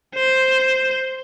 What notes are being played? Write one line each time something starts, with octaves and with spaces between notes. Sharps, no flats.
C5